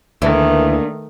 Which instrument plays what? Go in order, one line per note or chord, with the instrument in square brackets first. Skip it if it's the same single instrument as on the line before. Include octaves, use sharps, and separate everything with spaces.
[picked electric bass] D2 [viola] D#3 A3 [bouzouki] E3 [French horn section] A#3 D4